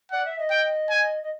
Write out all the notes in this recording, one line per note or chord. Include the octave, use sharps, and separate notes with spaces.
D5 F#5
E5
D#5
G5
G#5
D#5